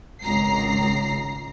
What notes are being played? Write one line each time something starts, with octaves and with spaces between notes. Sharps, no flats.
G#1 C#2 A#5 C7